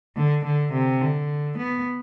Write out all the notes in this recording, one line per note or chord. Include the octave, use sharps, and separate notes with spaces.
D3
D3
C3
D3
B3